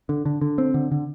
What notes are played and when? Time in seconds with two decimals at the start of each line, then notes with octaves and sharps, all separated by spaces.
0.09 D3
0.26 D3
0.41 D3
0.58 C4
0.74 D3
0.92 D3